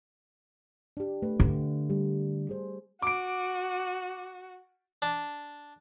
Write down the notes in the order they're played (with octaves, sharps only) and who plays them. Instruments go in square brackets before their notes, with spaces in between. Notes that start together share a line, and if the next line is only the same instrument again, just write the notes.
[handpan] D4 G4
A3 B4
[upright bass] D3
[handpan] G3
G#4 C5
[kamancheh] F#4 [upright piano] D6 D7
[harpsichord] D4